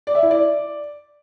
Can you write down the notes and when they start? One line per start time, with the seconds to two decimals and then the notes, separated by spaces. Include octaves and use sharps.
0.07 D5
0.15 E5
0.23 E4
0.31 D5